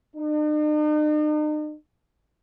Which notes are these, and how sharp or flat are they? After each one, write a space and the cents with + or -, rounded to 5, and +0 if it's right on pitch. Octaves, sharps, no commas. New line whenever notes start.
D#4 -45